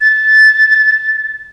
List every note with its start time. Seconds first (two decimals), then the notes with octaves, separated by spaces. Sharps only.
0.01 A6